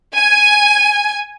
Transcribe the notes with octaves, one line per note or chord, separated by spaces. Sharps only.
G#5